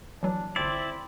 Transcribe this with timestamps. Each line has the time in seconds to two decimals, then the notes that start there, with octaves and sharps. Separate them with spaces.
0.23 E3 F#3 D4
0.56 G1 C4 E4 D5 D7